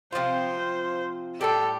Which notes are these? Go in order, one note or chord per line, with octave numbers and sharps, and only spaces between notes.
C3 F3 C4 F4 C5
A2 G3 D4 G4 A4